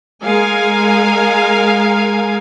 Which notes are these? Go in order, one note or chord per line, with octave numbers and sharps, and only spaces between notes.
G#3 A#4 F5 G#5